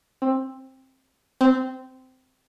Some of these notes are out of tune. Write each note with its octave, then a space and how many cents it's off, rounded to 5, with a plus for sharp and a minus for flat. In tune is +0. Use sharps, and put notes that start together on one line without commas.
C4 +15
C4 -15